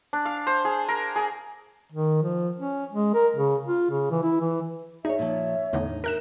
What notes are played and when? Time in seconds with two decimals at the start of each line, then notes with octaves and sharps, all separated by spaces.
0.13 D4
0.25 F5
0.47 C5
0.65 G#4
0.88 A#4
1.16 G#4
1.92 D#3
2.22 F3
2.58 C#4
2.92 G#3
3.14 A#4
3.36 C#3
3.66 F4
3.90 C#3
4.11 E3
4.23 E4
4.41 E3
5.05 D#4 G#4 C#5 D5 E5
5.19 A#2 F3 C#5
5.73 E2 A2 D3 D#4
6.04 D#4 A#4 E5 G5 F#6 E7